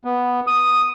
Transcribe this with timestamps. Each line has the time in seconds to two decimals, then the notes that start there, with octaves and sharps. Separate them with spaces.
0.05 B3
0.47 D#6